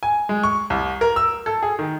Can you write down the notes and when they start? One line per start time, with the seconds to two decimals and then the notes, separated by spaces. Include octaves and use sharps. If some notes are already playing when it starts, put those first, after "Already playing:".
0.03 G#5
0.29 G#3
0.43 C#6
0.70 C2
1.01 A#4
1.16 E6
1.46 A4
1.63 G#4
1.79 D#3